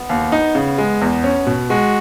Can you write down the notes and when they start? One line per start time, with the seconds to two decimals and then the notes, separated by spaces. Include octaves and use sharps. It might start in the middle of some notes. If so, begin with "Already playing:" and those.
Already playing: B3
0.09 D#2
0.32 D#4
0.55 C#3
0.78 G#3
1.01 E2
1.24 C#4
1.46 B2
1.70 G#3 F#4